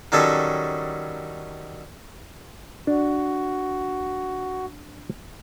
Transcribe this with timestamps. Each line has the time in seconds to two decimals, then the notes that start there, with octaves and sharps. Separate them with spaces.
0.12 D#3 F#3 G3 C#4 A4 D#5
2.87 D4 F#4